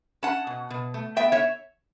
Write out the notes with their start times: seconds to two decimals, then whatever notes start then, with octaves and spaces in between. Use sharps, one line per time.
0.23 C#4 F#5 A5
0.47 B2
0.70 B2
0.94 A3
1.16 B3 E5 G5
1.32 C#5 E5